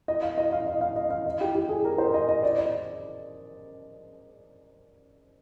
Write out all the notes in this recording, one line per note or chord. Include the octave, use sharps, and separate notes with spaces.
D#5
F5
D#5
F5
D#5
F5
D#5
F5
D#5
G4
G4
G#4
A#4
C5
D#5
D#5
D5
D#5